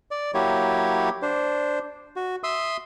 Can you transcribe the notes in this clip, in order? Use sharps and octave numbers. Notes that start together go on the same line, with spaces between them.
D5
F#3 A#3 E4 G4 C#5
D4 C5
F#4
E5 C6 D#6 E6